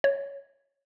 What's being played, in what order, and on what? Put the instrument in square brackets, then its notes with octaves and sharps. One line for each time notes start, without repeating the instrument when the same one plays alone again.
[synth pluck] C#5